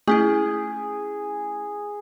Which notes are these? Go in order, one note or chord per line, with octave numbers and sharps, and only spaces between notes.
A3 C#4 E4 G#4